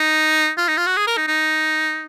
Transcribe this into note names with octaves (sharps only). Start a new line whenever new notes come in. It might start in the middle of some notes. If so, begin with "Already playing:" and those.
Already playing: D#4
F4
D#4
F4
F#4
G#4
A#4
D#4
D#4